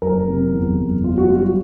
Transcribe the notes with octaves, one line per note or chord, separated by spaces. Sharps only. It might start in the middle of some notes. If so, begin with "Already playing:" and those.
F#1 A#4
C3
E2
F#1
B3 F4
F#4
G3 F4
F#4